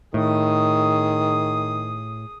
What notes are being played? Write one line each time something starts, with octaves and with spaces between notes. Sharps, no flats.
A2 D#3 G#4 D#6